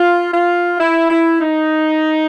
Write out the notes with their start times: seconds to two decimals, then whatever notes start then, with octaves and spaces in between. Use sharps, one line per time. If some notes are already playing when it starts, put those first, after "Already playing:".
Already playing: F4
0.34 F4
0.80 E4
1.10 E4
1.41 D#4